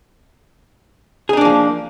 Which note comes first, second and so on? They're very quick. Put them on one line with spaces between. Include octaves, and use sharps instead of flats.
G#4 D#4 D4 A#3 F3